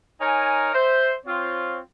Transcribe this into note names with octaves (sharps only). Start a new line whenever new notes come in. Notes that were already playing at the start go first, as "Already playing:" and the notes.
D#4 A#4 C#5 G#5
C5 E5
C4 F4 C#5